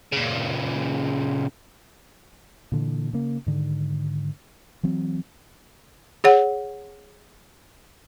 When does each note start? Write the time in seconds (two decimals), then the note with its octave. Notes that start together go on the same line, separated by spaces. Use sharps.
0.13 A#2 C#3
2.72 A#2 D3 E3
3.13 C#3 A#3
3.46 G#2 D3 D#3
4.83 E3 F#3 C4
6.24 G#4 C#5 F#5